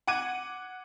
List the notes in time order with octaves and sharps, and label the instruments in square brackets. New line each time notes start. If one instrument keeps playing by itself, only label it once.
[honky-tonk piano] F#5 D6 G#6 D#7